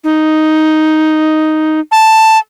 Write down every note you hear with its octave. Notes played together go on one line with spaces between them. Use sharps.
D#4
A5